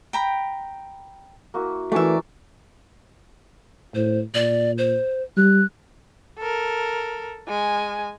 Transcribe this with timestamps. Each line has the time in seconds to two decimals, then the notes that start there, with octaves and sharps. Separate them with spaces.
0.13 G5 A#5 B5
1.54 A#3 E4 F#4
1.92 E3 A3 A#3 C#4 F#4 D5 E5
3.95 A2 C5
4.35 A#2 D5
4.78 C5
5.37 G3 F#6
6.39 A4 A#4
7.48 G#3 G#5